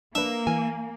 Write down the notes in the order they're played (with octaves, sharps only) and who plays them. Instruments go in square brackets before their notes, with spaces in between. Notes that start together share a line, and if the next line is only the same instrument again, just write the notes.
[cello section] A#3 [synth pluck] D4 B4 [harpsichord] E5
[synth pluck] E3 F6 [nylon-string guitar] G#5